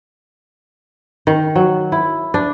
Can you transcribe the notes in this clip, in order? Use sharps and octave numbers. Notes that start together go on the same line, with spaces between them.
D#3
F#3
E4
D4